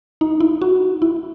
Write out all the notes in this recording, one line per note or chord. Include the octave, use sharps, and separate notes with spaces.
D#4
E4
F#4
E4